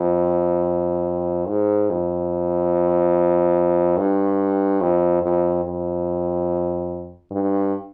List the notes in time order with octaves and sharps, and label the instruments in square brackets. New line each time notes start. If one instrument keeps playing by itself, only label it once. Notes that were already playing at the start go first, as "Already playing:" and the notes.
Already playing: [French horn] F2
G#2
F2
G2
F2
F2
F2
G2